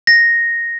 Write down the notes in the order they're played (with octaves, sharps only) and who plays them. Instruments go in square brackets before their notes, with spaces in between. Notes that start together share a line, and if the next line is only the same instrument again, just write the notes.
[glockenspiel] A#6